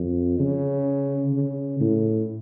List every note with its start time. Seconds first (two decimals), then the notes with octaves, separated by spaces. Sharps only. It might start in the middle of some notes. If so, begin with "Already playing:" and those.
Already playing: F2
0.39 C#3
1.33 C#3
1.81 A2